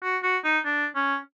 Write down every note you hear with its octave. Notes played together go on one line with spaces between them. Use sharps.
F#4
F#4
D#4
D4
C#4